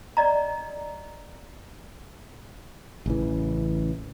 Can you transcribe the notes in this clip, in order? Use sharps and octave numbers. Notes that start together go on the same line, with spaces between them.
D5 D#5 A#5
A1 C#3 E3